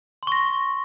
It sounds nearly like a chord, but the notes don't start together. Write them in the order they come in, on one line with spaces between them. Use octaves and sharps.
C6 C#6 A#6